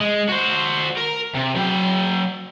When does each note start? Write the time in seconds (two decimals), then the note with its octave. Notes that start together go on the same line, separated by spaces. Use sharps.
0.01 G#3
0.29 F#4 C5
0.97 A#4
1.35 C3
1.56 F#3 G5